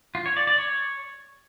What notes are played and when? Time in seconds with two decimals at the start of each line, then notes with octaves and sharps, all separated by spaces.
0.15 F4
0.26 C#5
0.37 D5
0.47 D5
0.58 C#5